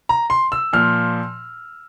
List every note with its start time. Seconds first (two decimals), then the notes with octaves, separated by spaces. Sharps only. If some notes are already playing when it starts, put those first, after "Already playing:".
0.09 A#5
0.30 C6
0.52 E6
0.73 A#2 F3 F6